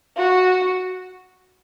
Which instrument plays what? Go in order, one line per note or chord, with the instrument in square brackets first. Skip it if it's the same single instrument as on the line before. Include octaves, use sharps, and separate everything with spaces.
[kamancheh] F#4